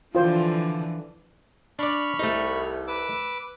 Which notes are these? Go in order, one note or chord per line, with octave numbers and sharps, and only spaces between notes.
D3 E3 F3 F4 C5
D4 D5 B5 C#6 F6
C2 A3 D#4
B4 D6 E6